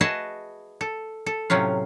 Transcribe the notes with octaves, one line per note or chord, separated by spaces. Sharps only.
F#4 G#4 B4 D#5 E5 A5
A4
A4
A2 C3 F#3 C#4 F4